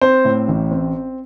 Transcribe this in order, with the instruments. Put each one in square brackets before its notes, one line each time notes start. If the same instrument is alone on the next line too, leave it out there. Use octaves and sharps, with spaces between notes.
[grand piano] C4 C5
A2
A1
C4